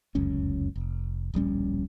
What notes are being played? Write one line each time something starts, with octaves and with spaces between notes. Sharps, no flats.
F1 C#2 F#2 C#4
F1
D1 A#1 G3 C#4